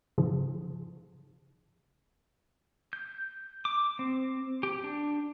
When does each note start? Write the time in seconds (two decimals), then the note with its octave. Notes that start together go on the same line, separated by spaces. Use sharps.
0.18 G#2 C#3 F3
2.93 G6
3.65 D6
3.99 C4
4.63 G4
4.84 D4